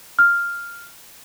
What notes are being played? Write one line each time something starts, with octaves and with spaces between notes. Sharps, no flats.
F6